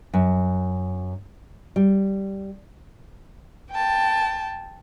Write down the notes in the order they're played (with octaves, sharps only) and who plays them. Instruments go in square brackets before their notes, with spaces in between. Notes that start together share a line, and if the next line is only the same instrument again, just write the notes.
[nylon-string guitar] F#2
G3
[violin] G5 A5